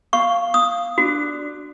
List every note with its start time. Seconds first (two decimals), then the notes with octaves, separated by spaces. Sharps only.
0.13 F5 C#6
0.54 D#6
0.98 D4 F#4